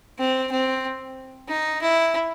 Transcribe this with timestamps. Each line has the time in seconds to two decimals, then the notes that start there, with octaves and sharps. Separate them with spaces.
0.19 C4
0.52 C4
1.49 D#4
1.82 E4